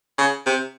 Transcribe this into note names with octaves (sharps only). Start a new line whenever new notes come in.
C#3
C3